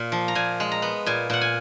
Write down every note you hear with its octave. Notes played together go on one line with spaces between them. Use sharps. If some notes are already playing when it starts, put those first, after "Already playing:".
Already playing: A#2 A#3
F3
A#5
A#2 G#5
G#3
A#5
B3
A#2 G#5
A#2 F#5
G#5